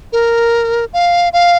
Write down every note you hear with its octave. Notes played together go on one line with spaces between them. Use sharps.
A#4
F5
F5